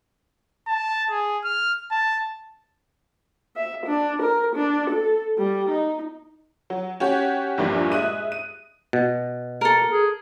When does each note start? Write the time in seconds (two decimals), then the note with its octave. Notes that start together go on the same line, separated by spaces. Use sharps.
0.67 A5
1.10 G#4
1.44 F6
1.91 A5
3.56 E5
3.86 D4
4.22 A#4
4.56 D4
4.90 A4
5.38 G3
5.70 D#4
6.70 F#3
7.00 C#4 F#4 G4 C#5
7.58 A#1 E2 G2 A#2 F3
7.92 G#3 E5 D#6 F#6 D#7
8.32 D#7
8.93 B2
9.61 A4 A#4
9.90 G#4